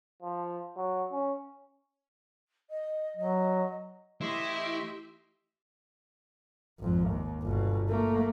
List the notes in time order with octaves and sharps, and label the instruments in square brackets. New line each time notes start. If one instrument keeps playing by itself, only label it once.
[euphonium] F3
F#3
C#4
[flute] D#5
[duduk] F#3 [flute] D#5
[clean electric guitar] E3 A3 [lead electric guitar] E4 [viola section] G4 E5 [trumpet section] D#5 C6
[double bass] G#1 F2
D#2
G1 B2
A3 A#3